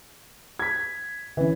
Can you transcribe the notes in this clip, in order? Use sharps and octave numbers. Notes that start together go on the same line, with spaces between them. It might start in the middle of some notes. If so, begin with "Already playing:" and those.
G#6 B6
D3 E3 C#4